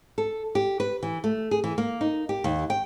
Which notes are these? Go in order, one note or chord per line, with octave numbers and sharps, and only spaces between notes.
A4
G4
B4
E3
A3
G#4
E3
A#3
D#4
G4
D#2
G5